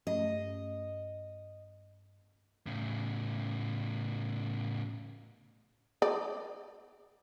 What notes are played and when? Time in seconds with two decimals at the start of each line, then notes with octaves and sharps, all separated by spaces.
0.07 G2 A3 C#4 D#5
2.66 A2 C#3
6.02 D5